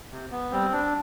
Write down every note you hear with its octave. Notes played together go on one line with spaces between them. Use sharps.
C3
B3
G3 C4
D4